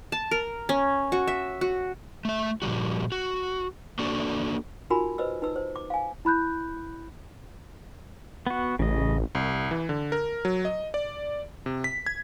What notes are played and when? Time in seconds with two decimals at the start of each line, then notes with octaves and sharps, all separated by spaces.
0.12 A5
0.31 A#4
0.69 C#4
1.12 F#4
1.27 E5
1.61 F#4
2.25 A3 E5
2.62 A#2 F3 G3 F#4
3.12 F#4
3.99 A#3 D4 F#4 A4 D5
4.90 D#4 F4 F#4 A#4 G#5 B5
5.18 B4 C5 D#5 E6
5.42 D#4 B4 E6
5.56 C5
5.76 D6
5.90 F5 G#5
6.25 E4 B5 F#6 G6
8.47 B3 F#4
8.79 A1 C#3 D#5
9.35 C2
9.71 E3
9.89 D3
10.12 A#4
10.45 F#3
10.65 D#5
10.94 D5
11.66 C3
11.84 B6
12.06 G#6